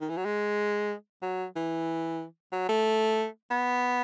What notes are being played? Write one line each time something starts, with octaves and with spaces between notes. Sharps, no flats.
D#3
E3
F#3
G#3
F#3
E3
F#3
A3
B3